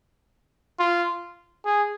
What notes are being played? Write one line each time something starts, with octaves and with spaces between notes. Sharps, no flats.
F4
G#4